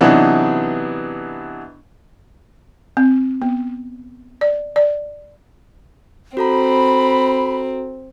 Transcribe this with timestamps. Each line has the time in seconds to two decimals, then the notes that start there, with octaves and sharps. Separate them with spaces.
0.01 C3 E3 F#3 B3 D4 D#4
2.97 C4
3.42 B3
4.41 D5
4.76 D5
6.37 C4 F#4 A4 A#5 B5